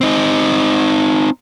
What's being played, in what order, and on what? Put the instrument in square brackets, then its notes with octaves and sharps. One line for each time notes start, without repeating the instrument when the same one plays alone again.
[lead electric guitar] C4 D#4